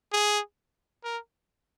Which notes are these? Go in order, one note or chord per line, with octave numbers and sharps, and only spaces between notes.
G#4
A#4